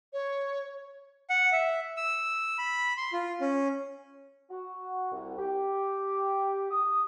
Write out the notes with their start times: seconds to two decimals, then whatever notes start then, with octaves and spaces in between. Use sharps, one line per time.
0.13 C#5
1.30 F#5
1.52 E5
1.97 E6
2.58 B5
2.97 C6
3.13 F4
3.41 C#4
4.50 F#4
5.12 C2
5.38 G4
6.71 D#6